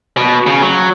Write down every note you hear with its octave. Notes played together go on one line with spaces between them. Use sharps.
B2
C#3
F#3